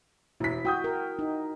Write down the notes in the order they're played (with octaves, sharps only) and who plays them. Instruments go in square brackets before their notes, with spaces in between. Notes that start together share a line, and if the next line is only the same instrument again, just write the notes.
[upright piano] E1 B6 [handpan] E4
[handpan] F#4 [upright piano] G5 D#6 G6
[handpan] A#4
D#4